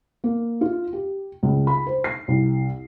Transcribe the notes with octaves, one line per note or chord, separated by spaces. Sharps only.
A#3
F4
G4
C#2
B5
C5
C7
C2